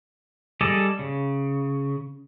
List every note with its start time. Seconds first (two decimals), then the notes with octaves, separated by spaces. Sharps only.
0.61 G3 G#4 A4 D5 D#5
0.99 C#3